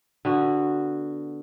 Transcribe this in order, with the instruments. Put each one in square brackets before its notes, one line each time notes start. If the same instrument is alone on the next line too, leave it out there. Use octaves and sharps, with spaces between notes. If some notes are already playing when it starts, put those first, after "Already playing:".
[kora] D3 B3 F#4